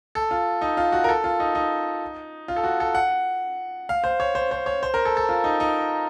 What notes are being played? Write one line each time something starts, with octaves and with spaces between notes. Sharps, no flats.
A4
F4
D#4
F4
F#4
A#4
A4
F4
D#4
D#4
F4
A4
F#4
A4
F#5
F5
C5
C#5
C5
C5
C#5
C5
A#4
A4
A4
F4
D#4
D#4